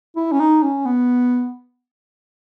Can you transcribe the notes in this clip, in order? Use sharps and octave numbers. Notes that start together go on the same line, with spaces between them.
E4
C#4
D#4
C#4
B3